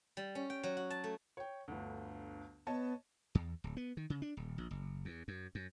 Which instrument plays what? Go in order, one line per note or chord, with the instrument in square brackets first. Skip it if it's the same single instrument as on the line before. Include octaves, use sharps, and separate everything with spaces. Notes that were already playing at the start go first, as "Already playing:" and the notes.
[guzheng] G3
C#4
G5
F#3
F#4
A5
A3
[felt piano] C#5 G5
G1 D2
[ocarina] B3 [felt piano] C#5 D#5 A5
[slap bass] E2
D1
B3
D#3
C#3
D4
D#1
A#1
F#1
E2
F#2
F#2